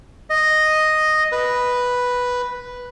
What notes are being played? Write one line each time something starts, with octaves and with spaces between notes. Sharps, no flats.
D#5
B4